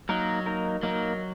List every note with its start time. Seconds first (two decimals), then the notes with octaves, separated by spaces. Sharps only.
0.09 F#3 A#3 D#4 A#4
0.46 A#3 D#4 A#4
0.83 F#3 A#3 D#4 A#4